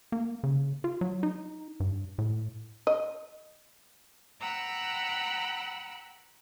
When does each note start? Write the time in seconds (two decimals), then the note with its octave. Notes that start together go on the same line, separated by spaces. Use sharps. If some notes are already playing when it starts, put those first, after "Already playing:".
0.12 A#3
0.43 C#3
0.84 F4
1.01 F#3
1.23 D#4
1.80 G2
2.18 A2
2.87 D#5
4.40 F#5 G5 A#5 B5 E6 F#6